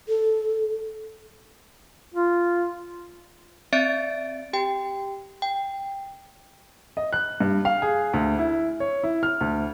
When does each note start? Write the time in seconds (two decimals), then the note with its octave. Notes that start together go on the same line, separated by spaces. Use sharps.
0.08 A4
2.14 F4
3.73 C4 D5 E5 A6 D7
4.53 G4 G5
5.42 G5
6.97 D#5
7.13 F#6
7.40 G2
7.65 F5
7.82 G#4
8.13 D2
8.39 E4
8.80 C#5
9.03 E4
9.23 F6
9.41 D2